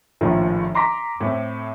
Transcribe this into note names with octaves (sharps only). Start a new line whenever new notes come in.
A#1 A2 D#3 F3
A#5 C6 D6 A#6 B6
A2 C4